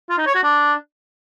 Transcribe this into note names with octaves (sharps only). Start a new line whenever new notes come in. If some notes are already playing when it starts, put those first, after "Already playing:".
F4
D#4
C#5
F#4
D4